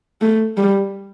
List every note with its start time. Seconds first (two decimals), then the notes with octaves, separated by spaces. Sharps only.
0.21 A3
0.57 G3